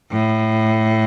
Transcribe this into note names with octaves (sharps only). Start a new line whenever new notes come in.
A2